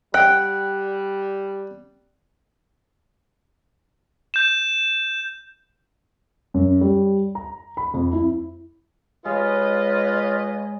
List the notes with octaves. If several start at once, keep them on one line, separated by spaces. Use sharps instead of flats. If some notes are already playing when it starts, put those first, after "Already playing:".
G3 F#5 G5
G6 E7
F#2
G3
A#5
B5
F2
E4
G#3 F4 B4 C#5 D#5